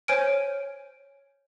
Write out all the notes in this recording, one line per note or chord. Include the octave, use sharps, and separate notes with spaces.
C5 C#5 G#5 F6 D7